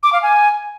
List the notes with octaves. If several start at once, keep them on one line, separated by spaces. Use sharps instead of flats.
D6
F5
G#5